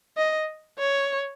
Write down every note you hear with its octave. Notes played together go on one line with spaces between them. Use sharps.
D#5
C#5